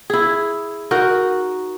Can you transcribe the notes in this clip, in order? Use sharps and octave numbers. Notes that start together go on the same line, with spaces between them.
E4 G#4
D#4 F#4 A#4